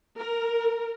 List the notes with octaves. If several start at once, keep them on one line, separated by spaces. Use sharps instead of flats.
A#4